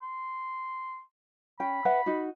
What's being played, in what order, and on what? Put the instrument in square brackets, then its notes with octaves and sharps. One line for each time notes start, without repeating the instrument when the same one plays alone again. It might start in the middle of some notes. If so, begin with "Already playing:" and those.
[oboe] C6
[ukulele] C#4 G5 [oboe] B5
[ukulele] B4 E5 F#5
D#4 F#4